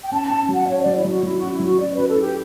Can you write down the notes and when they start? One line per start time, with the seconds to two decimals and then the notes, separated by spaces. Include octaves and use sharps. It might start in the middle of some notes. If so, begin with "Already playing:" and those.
0.03 G5
0.12 C#4 A5
0.25 C#4 A5
0.49 F#3 F#5
0.67 C#4 C#5
0.81 F#3 D5
0.95 E4
1.05 F#3 F#4
1.23 F#3 E4
1.37 C#4 F#4
1.51 E4
1.60 F#3
1.65 F#4
1.78 C#4 D5
1.93 C#4 B4
2.06 A4
2.16 E4 G4